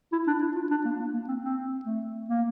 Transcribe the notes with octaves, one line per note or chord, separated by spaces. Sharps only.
E4
D4
E4
F4
D4
A#3
A#3
A#3
C4
C4
A3
A#3